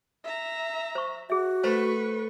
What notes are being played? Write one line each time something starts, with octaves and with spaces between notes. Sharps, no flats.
E5 A#5
C5 C#6
F#4 G#4 E5
A3 B4 C5 C#6